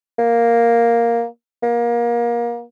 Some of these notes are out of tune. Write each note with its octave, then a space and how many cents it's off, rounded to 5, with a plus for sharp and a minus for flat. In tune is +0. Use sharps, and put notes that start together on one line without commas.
A#3 +0
A#3 +25